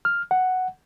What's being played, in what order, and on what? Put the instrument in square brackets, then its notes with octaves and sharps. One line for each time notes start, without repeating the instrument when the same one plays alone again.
[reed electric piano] F6
F#5